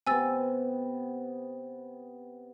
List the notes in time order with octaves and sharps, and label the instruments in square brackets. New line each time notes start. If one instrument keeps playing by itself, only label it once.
[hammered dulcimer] C3 B3 [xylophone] G#5 E6 A6